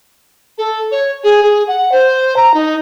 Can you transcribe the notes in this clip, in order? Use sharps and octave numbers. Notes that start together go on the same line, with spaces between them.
A4
C#5
G#4
G#4
F#5
C5
A#5
D#4